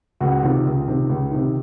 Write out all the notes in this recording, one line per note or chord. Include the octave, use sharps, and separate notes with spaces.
C#2 F#4
C3 D#3 F4
C#2
C3 D#3
C#2
C3 D#3